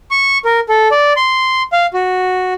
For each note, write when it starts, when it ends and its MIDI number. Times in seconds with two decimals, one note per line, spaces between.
0.11 0.38 85
0.45 0.60 70
0.69 0.88 69
0.91 1.13 74
1.16 1.63 84
1.73 1.86 77
1.94 2.54 66